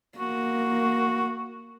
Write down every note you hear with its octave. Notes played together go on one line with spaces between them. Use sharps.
A#3 F#4